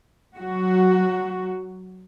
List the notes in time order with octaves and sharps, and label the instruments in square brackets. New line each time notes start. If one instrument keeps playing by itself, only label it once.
[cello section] F#3 F#4